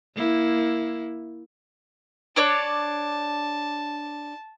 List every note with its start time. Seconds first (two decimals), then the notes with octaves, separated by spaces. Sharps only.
0.15 A#3 E4
2.36 D4 C#5 D5 A5